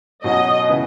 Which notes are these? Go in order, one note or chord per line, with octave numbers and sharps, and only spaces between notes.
B2 F#3 C#4 F#4 D#5
C#3 E3 B3 E4